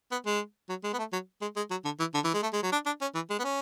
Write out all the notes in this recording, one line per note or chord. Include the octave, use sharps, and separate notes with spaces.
B3
G#3
F#3
G#3
B3
A3
F#3
G#3
G#3
F#3
D3
E3
D3
E3
G#3
A3
G#3
F#3
D4
D4
C#4
E3
G#3
B3
C#4